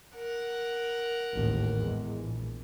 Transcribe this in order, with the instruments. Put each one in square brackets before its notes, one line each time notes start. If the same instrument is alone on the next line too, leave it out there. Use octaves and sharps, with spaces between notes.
[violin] A#4 F#5
[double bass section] A1 D#2 G#2
E2 G#3
A#1